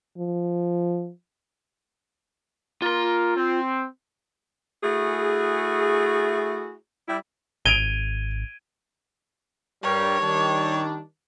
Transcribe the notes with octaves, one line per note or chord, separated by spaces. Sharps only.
F3
A#3 F4 A#4 C6
C4
A3 E4 F#4 G#4
G3 E4
G#1 G#6 D7 D#7 F7 G7
G2 G3 A#4 C#5
D#3 G3 D4